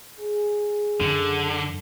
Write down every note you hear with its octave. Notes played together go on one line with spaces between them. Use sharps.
G#4
F#2 D3